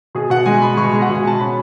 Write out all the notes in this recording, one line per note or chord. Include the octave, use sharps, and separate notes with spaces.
B2 G#4
B2 F#5
G#3 G#5
B2 B5
B2 C#6
G#3
F#5
B2
G#5
B2 A5
C#4 B5